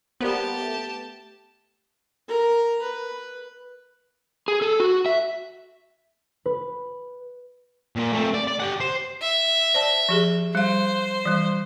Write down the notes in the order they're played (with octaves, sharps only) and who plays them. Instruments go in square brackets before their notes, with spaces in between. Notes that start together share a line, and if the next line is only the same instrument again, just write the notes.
[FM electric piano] G3 A#3 C5 [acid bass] B3 [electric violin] G4 A5
[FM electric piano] A3
[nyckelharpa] A#4 A#5
B4
[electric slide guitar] G#4
A4
F#4
E5
[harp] B4
[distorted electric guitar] A#2 A#3
A3 C4
D5
D5
G4 F#5
C5
[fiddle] E5
[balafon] C5 D5 A5
F3 G4 G#4
[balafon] G3 F5 [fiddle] C5
[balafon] E3 G3